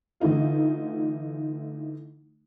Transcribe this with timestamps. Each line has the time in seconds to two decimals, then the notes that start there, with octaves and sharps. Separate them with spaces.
0.20 D3 E3 A3 D#4 F4